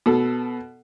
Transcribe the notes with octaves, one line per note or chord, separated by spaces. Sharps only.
B2 A4